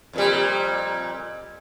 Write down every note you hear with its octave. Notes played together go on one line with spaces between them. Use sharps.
F2 A#2 G3